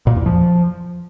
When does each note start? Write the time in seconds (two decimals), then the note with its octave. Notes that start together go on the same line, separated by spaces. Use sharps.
0.07 A#2
0.16 E2
0.26 F3